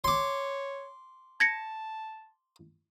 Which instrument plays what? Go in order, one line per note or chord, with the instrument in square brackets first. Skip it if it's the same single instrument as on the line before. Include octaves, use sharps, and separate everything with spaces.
[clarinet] C#5 [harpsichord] C6 D6
[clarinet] A5 [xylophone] G#6 A#6 C#7